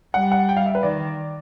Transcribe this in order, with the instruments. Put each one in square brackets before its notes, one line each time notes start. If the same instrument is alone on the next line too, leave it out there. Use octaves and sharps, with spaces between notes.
[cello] G3 [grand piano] F#5
[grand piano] F#5
G5
F5
E5
B4
[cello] D#3 [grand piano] D5